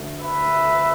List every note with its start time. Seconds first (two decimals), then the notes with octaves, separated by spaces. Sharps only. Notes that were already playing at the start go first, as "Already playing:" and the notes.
Already playing: D2 D3 A3
0.19 B4 E5